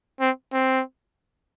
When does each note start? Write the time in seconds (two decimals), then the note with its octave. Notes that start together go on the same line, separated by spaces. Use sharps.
0.20 C4
0.53 C4